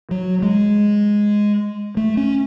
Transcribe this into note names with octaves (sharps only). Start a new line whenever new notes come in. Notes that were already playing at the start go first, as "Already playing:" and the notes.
F#3
G#3
A3
C#4